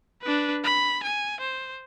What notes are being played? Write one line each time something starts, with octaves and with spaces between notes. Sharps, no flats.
D4 B4
B5
G#5
C5